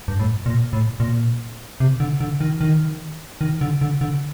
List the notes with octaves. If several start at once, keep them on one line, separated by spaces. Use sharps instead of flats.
G2
A2
A#2
A2
A#2
C3
D3
D3
D#3
D#3
D#3
D3
D3
D3